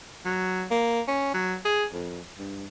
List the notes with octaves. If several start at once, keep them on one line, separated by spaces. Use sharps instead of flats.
F#3
A#3
C#4
F#3
G#4
F2
G2